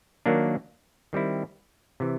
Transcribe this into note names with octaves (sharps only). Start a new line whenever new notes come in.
D#3 F#3 A#3 D4
D#3 G3 C4 E4
C3 E3